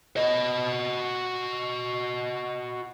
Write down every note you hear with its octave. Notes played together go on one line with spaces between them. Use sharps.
F#4 D#5